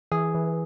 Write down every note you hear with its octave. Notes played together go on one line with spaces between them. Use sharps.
E3 G#4
E3